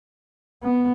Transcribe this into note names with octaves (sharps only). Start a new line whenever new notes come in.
B3